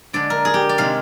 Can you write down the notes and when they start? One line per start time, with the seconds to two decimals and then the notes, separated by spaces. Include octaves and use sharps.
0.13 D3 G#3 D4 D5
0.30 A#4
0.45 G#4
0.54 G4
0.69 D5
0.78 C3 D#3 G#3 C4 F5